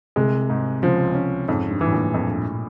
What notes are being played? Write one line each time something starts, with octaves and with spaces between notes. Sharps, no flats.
C2 C3 G#3
G#2
C#2 C#3 F3
C#4
F2 G#2
G2
E3
A2
A#1 A#2
F2